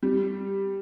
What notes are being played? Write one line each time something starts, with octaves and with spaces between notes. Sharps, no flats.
G3